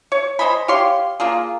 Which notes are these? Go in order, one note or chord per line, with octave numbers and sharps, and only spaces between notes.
C#5
C5 D#5 G#5 B5
G4 C#5 F5 C6
A#3 F4 G#4